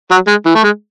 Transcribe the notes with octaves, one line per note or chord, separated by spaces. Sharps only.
F#3
G#3
E3
A3
G#3